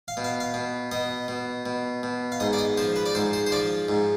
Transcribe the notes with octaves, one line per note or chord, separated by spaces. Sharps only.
F5
B2
F5
F5
B2
B2 D#5
B2
B2
B2
F5
G#2 D#5
D5
D#5
F3 C5
B4
D5
G#2 C5
C5
C5
F3 D5
G#2